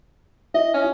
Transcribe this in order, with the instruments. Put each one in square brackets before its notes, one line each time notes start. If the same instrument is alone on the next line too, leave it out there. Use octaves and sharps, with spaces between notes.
[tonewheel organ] E4 [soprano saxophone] D#5
[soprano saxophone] C#4